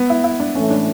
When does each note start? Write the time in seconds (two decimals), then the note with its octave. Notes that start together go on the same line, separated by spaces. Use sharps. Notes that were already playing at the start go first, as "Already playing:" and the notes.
Already playing: B3
0.10 E4
0.24 E4
0.40 D4
0.55 A2 E3 A3 C#4
0.70 D4